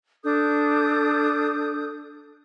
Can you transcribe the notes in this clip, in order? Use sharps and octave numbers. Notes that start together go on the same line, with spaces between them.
D4 A4 D#6 G6